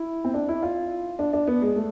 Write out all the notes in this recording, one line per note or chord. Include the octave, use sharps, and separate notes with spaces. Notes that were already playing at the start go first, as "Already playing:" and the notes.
Already playing: E4
C4
D4
E4
F4
D4
D4
B3
G#3
A3